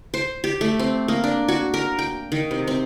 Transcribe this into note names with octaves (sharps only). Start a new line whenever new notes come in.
C5
G4
A3
C4
A#3
D4
F#4
A#4
G5
D#3
C3
C4